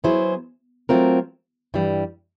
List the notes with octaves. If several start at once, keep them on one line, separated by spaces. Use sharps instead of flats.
F#3 B3 E4 G#4 C5
F#3 A3 C4 F4 A#4
G2 E3 G3